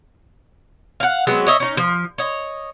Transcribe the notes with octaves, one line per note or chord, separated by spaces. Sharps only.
F5 F#5
F#3 G#3 B3 C4
C#5 D#5 E5
C#4 D#4
F3
C#5 D#5